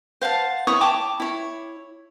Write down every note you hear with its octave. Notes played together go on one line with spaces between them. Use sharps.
C5 F5 F#5 A5
E4 C#5 C#6 D#6
G5 A5 D6
E4 C#5